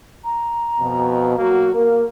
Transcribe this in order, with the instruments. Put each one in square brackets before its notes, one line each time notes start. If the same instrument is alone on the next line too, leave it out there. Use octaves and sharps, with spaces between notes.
[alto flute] A#5
[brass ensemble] F2 B2
F#3 A#3 F#4
[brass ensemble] A#3 [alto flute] A#4